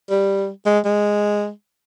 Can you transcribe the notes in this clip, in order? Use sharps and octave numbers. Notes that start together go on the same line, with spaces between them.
G3
G#3
G#3